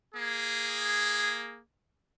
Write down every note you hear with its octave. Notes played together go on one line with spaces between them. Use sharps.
A#3 G#4